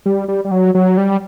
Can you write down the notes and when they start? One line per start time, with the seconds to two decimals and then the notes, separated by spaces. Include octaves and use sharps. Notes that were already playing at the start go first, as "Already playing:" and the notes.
0.06 G3
0.28 G3
0.45 G3
0.51 F#3
0.75 F#3
0.97 G3